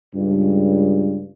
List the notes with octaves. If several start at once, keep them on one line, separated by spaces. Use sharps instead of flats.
C#2 G2